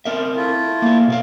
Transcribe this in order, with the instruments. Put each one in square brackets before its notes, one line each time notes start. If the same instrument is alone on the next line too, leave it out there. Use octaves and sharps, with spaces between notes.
[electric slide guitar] C4 A#4 E5
[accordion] A3 E4 F4
[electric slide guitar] A#3 G#4
B2 B4 F5